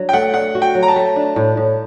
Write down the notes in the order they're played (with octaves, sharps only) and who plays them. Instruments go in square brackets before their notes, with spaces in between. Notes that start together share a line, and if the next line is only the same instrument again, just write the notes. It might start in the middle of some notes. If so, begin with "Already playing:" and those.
Already playing: [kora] F#3 D4 F#4
[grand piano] G5
[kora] A3 [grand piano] F#5
[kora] D4 [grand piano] F#5
[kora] F#4
[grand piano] G5
[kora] F#3
[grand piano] A#5
A5
[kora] A3
D4
A2
A2